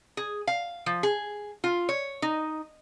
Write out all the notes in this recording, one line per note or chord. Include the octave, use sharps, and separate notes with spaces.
G#4
F5
F3
G#4
F4
C#5
D#4